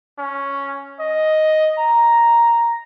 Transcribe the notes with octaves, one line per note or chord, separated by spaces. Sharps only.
C#4
D#5
A#5